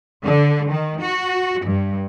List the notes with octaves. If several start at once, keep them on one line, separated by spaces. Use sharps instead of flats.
D3
D#3
F#4
G2